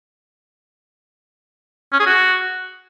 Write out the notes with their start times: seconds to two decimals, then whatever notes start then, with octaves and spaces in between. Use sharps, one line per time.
1.93 C#4
2.00 G#4
2.07 F#4